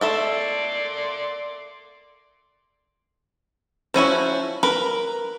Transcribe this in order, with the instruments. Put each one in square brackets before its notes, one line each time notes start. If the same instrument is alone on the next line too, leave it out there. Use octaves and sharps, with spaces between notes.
[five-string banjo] A3 A4 E5 [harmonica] D5 C6
[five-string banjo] F3 C#4 E4 F#4
A#4 B4